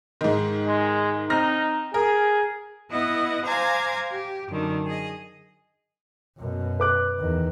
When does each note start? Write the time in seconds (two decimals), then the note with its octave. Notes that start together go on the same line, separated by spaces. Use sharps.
0.21 G#2 D#3
0.67 G#3
1.30 C4 D#4 F6 A#6
1.94 G#4 A#4
2.91 B3 E4 D#5 F#5
3.45 C5 F5 G#5 A#5 D6 G#6
4.11 G4
4.49 F#2 D3 D#3
4.87 G#4 D#5
6.38 F#2 B2
6.80 B4 D6 F#6
7.19 E2 D#3